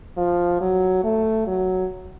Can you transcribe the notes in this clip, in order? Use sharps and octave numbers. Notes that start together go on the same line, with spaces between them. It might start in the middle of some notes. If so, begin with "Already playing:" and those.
F3
F#3
A3
F#3